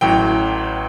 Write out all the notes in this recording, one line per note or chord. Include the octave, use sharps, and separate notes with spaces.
A1 A2 F#3 G5